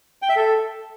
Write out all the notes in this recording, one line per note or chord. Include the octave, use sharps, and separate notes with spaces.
G5
E5
A4